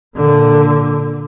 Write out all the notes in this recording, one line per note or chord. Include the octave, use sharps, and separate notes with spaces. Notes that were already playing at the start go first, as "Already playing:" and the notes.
A#2 D3